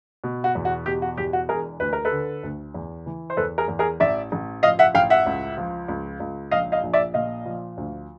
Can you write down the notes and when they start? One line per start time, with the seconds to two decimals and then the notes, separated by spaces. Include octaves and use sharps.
0.24 B2
0.44 F#4
0.55 E2
0.65 F#4
0.86 B2 G4
1.02 F#4
1.17 E2 G4
1.33 F#4
1.49 E1 G#4 A#4
1.80 D2 B4
1.93 A#4
2.05 A4 B4
2.12 D3
2.43 D2
2.74 E2
3.06 E3
3.30 C5
3.37 E2 A4 B4
3.58 G#4 A#4
3.68 E2
3.79 G#4 A#4
4.00 A1 D5 E5
4.32 A1
4.63 F3 D#5 F5
4.79 E5 F#5
4.95 A1 F5 G5
5.10 E5 F#5
5.26 C#2
5.57 F3
5.88 C#2
6.20 C#2
6.51 A#1 D#5 F5
6.72 D#5 F5
6.83 A#1
6.93 D5 E5
7.14 A#2 D#5 F5
7.45 F3
7.77 D2